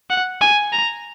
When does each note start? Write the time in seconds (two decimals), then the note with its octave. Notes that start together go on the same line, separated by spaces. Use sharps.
0.10 F#5
0.41 G#5
0.72 A#5